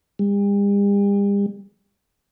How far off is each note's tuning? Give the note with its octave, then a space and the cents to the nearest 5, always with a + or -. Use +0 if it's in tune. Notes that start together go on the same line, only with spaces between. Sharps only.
G3 +45